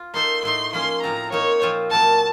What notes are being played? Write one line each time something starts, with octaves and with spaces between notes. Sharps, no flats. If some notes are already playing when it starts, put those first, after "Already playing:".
Already playing: F4
A#3 D#4 A4 C5 C6
A2 A3 D#4 C6
F3 A#3 C#4 C6
A2 F3 C4 F4 A#5
A#3 D#4 A#4 C#5
A#2 F3 C4 F4 C5
A#2 F#3 A#3 A5